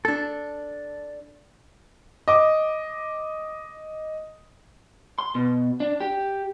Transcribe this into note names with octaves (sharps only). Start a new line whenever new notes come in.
D4 A4
D#5 D6
C6
B2
D4
G4